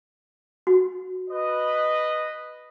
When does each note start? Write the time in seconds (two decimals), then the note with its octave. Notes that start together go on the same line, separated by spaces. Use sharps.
0.67 F#4
1.30 B4 D#5